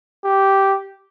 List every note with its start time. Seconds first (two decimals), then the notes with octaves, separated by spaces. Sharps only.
0.25 G4